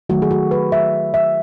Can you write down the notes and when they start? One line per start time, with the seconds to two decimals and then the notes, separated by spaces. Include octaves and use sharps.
0.09 D#3 F#3 A3 F#4
0.22 G#4
0.31 F#4
0.51 B4
0.72 E5
1.14 E5